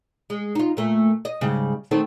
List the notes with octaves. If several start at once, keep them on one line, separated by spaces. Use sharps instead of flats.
G#3
D#4 F4
A#2 A3
D#5
G#2 C#3 G3
D#3 A3 C4